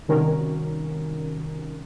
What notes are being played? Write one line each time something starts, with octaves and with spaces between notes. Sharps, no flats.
C3 D#3 G3 C#4 F#4 A#4